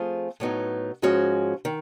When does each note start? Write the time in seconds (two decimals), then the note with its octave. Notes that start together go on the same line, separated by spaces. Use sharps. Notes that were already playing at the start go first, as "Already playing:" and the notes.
Already playing: F3 A3 C4 F4 G#4
0.40 A2 F#3 B3 D#4
1.02 G#2 F3 G#3 C#4 F#4
1.65 D#3